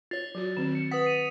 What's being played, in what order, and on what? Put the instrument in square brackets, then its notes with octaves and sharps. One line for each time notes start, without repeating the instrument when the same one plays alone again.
[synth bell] F4 C#5 [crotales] A6
[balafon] F#3 F#4
[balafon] D#3 F#3 C4 [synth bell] E7
[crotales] C#7
[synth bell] B4 F#5 [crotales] D#6 B6
[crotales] C7 D#7 F7